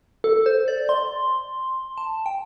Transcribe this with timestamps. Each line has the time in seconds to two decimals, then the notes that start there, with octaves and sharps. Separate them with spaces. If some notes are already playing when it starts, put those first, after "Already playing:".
0.24 A4
0.46 C5
0.68 D5
0.89 C6
1.98 A5
2.26 G5